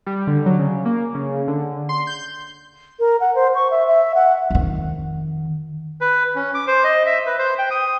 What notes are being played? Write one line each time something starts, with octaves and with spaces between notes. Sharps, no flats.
G3
D3
F#3
C#3
A#3
C#3
D3
C6
G6
A#4
F#5
C5
C#6
E5
E5
F#5
F2 D#3
B4
C#4
D6
C5
D#5
E5
B4
C5
G5
D#6